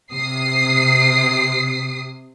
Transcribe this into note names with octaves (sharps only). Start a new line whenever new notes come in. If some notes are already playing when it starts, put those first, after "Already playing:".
C3 D#6 C7